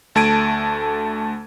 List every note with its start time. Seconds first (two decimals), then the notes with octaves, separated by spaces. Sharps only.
0.15 D2 A3 A5 G#6 D7 D#7